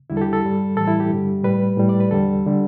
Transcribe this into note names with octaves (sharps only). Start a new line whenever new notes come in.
E2 D3 G3 E4
A4
G4
A4
G2 G3
A2 E3 G3 A4
E4
G4
G2 D3 G3
A2 G3 B4
A2 G3
D5
B4
E2 D3 G3 A4
D3 G3